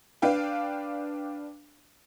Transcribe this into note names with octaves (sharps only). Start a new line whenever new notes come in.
D4 B4 F5 G5